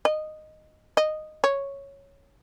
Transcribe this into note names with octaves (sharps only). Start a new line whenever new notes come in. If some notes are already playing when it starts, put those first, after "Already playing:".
D#5
D#5
C#5